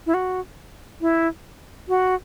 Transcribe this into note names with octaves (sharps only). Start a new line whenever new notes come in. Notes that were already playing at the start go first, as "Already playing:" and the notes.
E4
F#4
E4
F#4